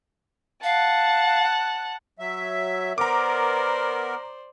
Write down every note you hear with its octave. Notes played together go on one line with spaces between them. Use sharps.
F5 F#5 A5
F#3 E5
B3 A#4 C5 D5 A#5 D6